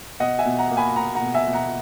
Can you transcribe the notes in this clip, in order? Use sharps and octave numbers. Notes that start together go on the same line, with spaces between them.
B2 D#5 F#5
E5 G#5
B2
F#5 A#5
A#3
G#5 B5
A#3 F#5 A#5
F#5 A#5
B2
E5 G#5
B2
F#5 A#5